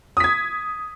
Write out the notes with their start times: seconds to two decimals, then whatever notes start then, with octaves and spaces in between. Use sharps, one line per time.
0.17 D#6
0.20 B6
0.24 G#6